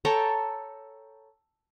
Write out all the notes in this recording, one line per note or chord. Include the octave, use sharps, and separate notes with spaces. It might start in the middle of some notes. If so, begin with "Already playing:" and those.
A4 C#5 G5 A#5